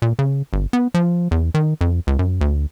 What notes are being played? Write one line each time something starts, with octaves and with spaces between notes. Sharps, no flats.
A#2
C#3
G1
B3
F3
E2
D#3
F2
C#2
F#2
D2